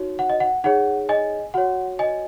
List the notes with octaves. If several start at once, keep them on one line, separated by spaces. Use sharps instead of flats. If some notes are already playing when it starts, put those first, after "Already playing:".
Already playing: D#4 F#4 C#5
F#5
D#5
F#5
D#4 G#4 C#5 F#5
D#5 G#5
F#4 C#5 F#5
D#5 G#5